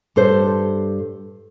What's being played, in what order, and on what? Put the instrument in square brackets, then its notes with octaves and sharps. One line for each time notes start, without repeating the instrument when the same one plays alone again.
[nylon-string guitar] G2 A4 C5